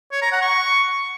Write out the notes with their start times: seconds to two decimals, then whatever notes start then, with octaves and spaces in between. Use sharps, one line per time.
0.12 C#5
0.22 A#5
0.32 F#5
0.42 C#6